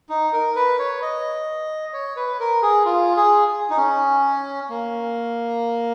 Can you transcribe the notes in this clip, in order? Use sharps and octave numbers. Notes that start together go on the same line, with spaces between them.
D#4
A#4
B4
C#5
D#5
C#5
B4
A#4
G#4
F4
G#4
D#4
C#4
A#3